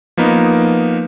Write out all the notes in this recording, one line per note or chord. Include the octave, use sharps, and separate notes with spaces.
F3 A#3 B3 D#4